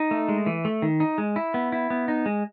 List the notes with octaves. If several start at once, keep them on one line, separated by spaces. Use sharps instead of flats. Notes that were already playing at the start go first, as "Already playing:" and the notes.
Already playing: D#4
A3
G#3
E3
A3
D#3
D#4
G#3
E4
B3
E4
B3
D#4
G#3